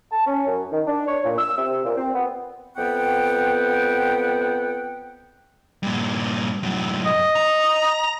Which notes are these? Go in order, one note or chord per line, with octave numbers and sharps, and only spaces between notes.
A5
C#4
F#2
D#3
D4
C#5
A#2
E6
C3
A#2
C4
B3
F2 B3 B4 F#5 G5
G2 A#2
F#2 A2
D#5
A#5